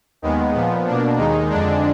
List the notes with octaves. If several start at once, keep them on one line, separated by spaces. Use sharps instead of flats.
D#2 D#3 G#3 B3
A#2 F3 B3
B2 A#3 D4
D#2 D#3 G#3 D#4
F2 D3 G#3 D4